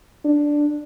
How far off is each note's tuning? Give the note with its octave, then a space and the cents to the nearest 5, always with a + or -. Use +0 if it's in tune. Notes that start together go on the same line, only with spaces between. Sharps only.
D4 +0